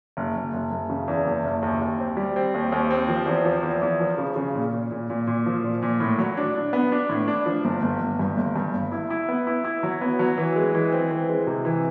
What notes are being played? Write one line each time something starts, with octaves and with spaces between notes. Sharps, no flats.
F#1
F#1
F#1
F#1
C#3
E2
F#1
F#1
D#2
D#2
C4
G3
C4
D#2
D#2
C4
F3
E2
F3
E2
E2
F3
C#3
C#3
A#2
A#2
A#2
A#2
A#2
F3
A#2
A#2
A2
F#3
D4
D4
B3
D4
A2
D4
F3
G1
G1
G1
G2
G1
G2
G1
E4
E4
B3
E4
E4
F#3
B3
F#3
E3
G#3
E3
C4
E3
G#3
C3
E3